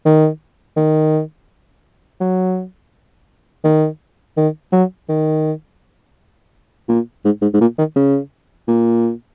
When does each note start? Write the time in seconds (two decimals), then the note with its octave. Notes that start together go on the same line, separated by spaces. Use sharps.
0.06 D#3
0.77 D#3
2.21 F#3
3.64 D#3
4.37 D#3
4.73 F#3
5.09 D#3
6.89 A#2
7.25 G#2
7.42 G#2
7.54 G#2
7.61 A#2
7.78 D#3
7.96 C#3
8.68 A#2